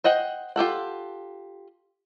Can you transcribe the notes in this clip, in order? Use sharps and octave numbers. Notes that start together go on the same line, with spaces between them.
C5 D#5 F#5 G5
F4 G4 A4 F#5